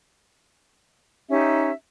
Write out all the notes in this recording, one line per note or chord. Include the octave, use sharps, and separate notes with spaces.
C#4 D#4 G4 E5